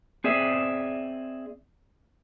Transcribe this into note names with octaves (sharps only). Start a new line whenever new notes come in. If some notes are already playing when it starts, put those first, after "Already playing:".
C4 G#4 D5 E5